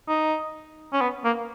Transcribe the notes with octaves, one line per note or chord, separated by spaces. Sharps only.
D#4
C#4
B3
A#3